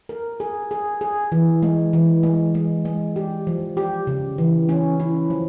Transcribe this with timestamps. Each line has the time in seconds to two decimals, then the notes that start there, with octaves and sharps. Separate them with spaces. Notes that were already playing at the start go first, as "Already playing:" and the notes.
0.09 A#4
0.40 G#4
0.71 G#4
1.01 G#4
1.32 E3
1.63 G#3
1.93 E3
2.23 G#3
2.55 G#3
2.85 G#3
3.16 G4
3.47 F3
3.77 G4
4.07 C#3
4.38 E3
4.69 C#4
5.00 E4
5.30 F3